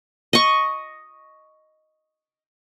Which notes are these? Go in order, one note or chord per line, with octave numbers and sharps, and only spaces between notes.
D#5 C#6